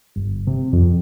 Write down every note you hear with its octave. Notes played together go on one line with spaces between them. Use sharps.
G1
C3
F2